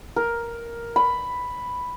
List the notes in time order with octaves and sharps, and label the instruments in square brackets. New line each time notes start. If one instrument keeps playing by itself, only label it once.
[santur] A#4
B5